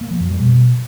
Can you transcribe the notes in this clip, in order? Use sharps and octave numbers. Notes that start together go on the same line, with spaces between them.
A#3
F3
F#2
G3
B2